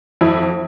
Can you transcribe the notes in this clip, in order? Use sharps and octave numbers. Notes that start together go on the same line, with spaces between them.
F2 E4